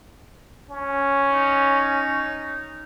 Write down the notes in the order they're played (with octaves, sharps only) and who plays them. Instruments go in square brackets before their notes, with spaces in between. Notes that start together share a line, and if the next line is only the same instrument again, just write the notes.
[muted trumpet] C#4
[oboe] D#4